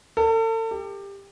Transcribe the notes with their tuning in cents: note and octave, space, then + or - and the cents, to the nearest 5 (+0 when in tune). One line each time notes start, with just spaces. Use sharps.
A4 +40
G4 +20